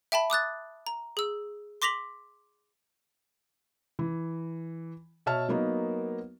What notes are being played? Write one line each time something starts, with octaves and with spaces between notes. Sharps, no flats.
E5 G5 A5 B5
D6 D#6 F#6 A6
A#5
G#4 E6
C6 D6 A#6 B6 F7 F#7
E3
B2 C#5 E5 A5 F6
F#3 A#3 B3 D#4 A#4